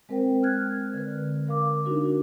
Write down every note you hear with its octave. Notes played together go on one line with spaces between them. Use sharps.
G#3 C4 A#4 C5 G5
F6 F#6 G#6
D3 B4
A#4 F5 D6
D4 D#4 F#4 A#4